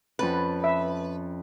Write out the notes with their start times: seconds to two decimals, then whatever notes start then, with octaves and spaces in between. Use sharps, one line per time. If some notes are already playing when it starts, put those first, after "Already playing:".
0.19 F2 C#4 B4 A5
0.64 E5